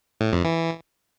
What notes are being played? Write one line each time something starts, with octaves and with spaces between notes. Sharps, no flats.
A2
F2
E3